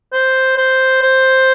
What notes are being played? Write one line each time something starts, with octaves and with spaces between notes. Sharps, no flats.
C5
C5
C5